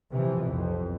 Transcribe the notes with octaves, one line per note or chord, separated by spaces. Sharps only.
C3 E3 F3
B1 F2